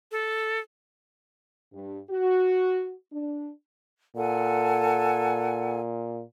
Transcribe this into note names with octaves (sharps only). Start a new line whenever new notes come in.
A4
G2
F#4
D4
A#2 A4 F#5 G#5